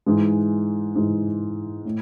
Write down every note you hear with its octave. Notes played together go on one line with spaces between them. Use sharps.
G#2 E3 G#3
G#2 E3 G#3
A2